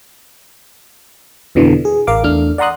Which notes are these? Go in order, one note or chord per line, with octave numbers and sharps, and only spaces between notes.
F2 B2 D3 E3
G#4
A1 A#4 F5 D6
E2 A3 D4 F6
D5 F#5 A#5 C6 D#6 F#6